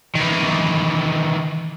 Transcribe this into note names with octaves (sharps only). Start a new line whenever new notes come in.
D#3 E3